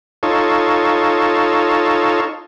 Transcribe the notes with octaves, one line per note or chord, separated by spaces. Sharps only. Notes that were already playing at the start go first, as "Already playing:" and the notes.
D#4 F4 A4 C#5